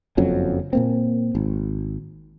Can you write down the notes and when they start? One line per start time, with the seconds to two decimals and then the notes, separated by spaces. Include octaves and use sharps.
0.17 F#1 F2 F#3 C#4
0.73 A#2 A#3 C4
1.35 G#1